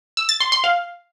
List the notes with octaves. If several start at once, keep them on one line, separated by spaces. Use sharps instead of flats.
E6
A6
C6
C6
F5